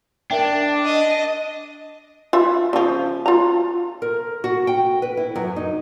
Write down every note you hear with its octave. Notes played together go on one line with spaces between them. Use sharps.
D4 A#4 E5 G5
D#5
F4 C#5 E5
C#3 F3
F4 A#5
A#4
F#4
G5
B4
E4
F#2
D#4